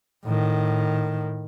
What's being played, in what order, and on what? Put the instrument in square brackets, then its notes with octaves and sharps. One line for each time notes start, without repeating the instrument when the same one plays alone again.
[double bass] A2 D#3